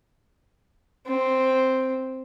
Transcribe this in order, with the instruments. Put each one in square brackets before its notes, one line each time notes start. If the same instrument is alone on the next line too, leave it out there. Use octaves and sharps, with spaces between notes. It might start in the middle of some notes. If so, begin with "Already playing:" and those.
[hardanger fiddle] C4